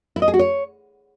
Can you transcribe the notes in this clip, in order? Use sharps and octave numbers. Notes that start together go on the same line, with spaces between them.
E4
D#5
G#4
F#4
C#5